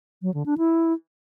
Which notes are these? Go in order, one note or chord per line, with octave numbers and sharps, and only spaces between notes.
F#3
D3
D4
E4